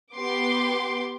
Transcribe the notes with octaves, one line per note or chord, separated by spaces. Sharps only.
B3 G4 C6 D6